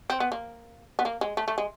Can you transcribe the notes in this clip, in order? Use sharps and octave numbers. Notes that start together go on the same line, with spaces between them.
C4
B3
A#3
B3
A#3
G#3
A3
A3
G#3